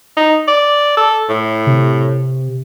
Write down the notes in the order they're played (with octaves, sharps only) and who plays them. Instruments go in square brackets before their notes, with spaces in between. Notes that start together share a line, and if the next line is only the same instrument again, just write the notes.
[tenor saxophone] D#4
D5
A4
A2
[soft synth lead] C3